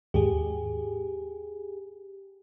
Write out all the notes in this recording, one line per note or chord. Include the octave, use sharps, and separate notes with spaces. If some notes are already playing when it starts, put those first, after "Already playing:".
D#2 G#2 G4 G#4